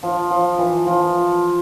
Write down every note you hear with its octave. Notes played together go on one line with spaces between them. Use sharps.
F3
F3
E3
F3